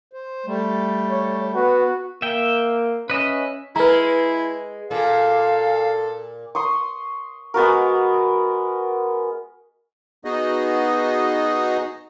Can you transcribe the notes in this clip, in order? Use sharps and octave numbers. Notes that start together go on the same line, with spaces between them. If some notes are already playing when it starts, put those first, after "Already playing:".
C5
G3 A3
C#5
B3 F#4 B4
A#3 E5 G5
C#4 B4 D#5 E5
G#3 E4 B4 A#5
A#2 A4 F5
C6 C#6 D#6
G#3 B3 F#4 A#4
B3 D#4 F#4 G#4 D#5